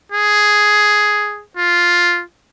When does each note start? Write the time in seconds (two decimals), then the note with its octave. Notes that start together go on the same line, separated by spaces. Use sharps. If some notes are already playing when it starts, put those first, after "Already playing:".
0.12 G#4
1.57 F4